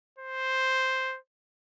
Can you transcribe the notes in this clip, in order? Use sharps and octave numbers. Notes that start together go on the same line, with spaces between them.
C5